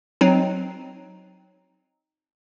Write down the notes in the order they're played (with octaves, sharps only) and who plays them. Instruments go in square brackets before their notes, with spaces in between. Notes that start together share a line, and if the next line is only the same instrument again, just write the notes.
[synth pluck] F#3 C4 D#4